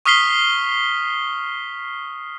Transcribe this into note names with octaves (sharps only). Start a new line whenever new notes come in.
C#6 D#6 F6 B6 C7 G7